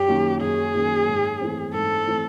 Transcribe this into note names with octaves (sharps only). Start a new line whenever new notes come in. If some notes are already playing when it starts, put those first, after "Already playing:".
Already playing: F#2 G4
D#3 F#3 A#3 C#4
F#2 G#4
D#3 F#3 A#3 C#4
G#2
E3 A3 C4
G#2 A4
E3 A3 C4